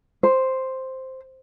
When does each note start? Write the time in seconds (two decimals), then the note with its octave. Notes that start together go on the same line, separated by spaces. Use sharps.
0.23 C5